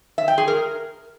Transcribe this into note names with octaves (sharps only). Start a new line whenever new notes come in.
E5
G5
G#4
A#4